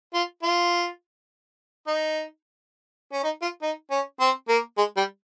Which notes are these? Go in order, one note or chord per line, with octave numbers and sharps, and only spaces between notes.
F4
F4
D#4
C#4
D#4
F4
D#4
C#4
C4
A#3
G#3
G3